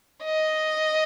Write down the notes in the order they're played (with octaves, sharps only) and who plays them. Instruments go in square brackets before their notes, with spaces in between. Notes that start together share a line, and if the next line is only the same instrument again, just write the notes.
[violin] D#5